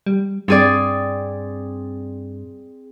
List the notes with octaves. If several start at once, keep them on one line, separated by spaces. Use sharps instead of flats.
G3
G2 C4 G#4 D5